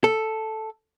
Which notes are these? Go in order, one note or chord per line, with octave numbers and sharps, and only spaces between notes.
A4